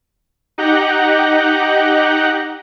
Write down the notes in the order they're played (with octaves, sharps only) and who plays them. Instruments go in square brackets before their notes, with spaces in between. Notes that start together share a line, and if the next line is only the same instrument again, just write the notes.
[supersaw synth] D#4 G4 F#5 F#6 G6 A#6